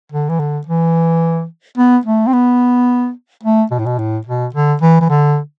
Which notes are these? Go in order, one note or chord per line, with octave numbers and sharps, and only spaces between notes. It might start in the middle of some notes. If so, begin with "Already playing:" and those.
D3
E3
D3
E3
B3
A3
C4
B3
A3
B2
A2
B2
A2
B2
D3
E3
E3
D3